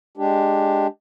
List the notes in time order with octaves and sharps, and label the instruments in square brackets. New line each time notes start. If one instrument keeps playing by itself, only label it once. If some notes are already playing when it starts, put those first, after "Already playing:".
[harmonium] G#3 D4 G4